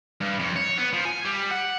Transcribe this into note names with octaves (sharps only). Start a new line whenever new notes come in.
G2
F2
C#5
B3
F3
G#5
G3
F#5